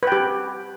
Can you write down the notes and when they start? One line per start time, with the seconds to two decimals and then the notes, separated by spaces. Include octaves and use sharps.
0.03 B4
0.07 G5
0.12 G4